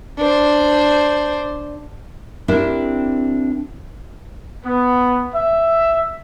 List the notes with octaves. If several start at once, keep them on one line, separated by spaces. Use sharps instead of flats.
D4 C5
C4 D4 E4 G4 A#4
B3
E5